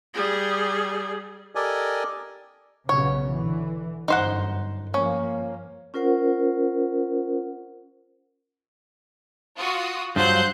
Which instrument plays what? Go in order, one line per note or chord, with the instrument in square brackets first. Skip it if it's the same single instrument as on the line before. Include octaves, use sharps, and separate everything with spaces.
[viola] G3 G#4
[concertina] G4 A4 A#4 D5 D#5 G#5
[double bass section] B1 C#3 B3 [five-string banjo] C#5
[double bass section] D3 E3
[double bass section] G1 F#2 [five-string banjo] D#4 C5 F#5
[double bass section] F3 A#3 [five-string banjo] C#4
[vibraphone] C#4 F4 A#4 C5 F#5
[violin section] F4 F#4 D#6
[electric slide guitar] G2 F3 F#3 [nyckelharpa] C5 [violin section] C6 F#6 G6